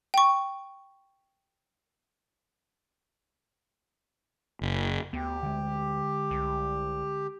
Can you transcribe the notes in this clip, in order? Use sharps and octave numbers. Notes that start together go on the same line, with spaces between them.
G5 C#6
F#1
D2 B3 G4
D3 G#3
C2